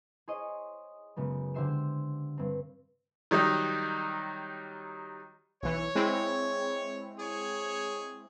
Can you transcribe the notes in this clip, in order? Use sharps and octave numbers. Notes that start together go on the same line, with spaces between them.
G#4 C5 C#5 D#5
F#2 C#3 G#3 B3
D3 G4 C5 E5 C7 E7
G2 C4
D#3 F#3 G3 D#4
B1 E3 C#5
G#3 C4 E4
G#4 C#5